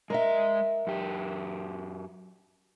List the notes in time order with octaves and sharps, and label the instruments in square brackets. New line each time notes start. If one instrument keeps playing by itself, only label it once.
[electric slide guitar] G#3 D#5 [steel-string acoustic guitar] A#4 E5
[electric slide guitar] F#2 G4